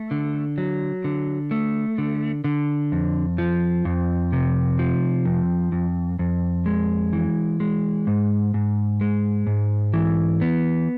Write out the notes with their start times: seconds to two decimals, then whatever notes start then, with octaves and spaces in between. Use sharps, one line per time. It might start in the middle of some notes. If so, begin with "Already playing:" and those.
Already playing: A3
0.11 D3
0.58 F#3
1.04 D3
1.51 A3
1.98 D3
2.44 D3
2.92 F2
3.38 F3
3.85 F2
4.32 C3
4.79 F3
5.25 F2
5.72 F2
6.19 F2
6.66 G#3
7.13 E3
7.60 G#3
8.07 G#2
8.54 G#2
9.01 G#3
9.47 G#2
9.94 E3
10.41 B3